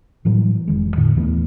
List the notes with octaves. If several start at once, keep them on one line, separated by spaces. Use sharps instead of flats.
A2 E3 F#3 G3
F1 D#3 G#3
E2 A2 D3
D#2 E3 A3 B3